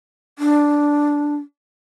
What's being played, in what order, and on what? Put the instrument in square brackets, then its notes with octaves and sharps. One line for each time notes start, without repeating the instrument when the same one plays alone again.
[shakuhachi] D4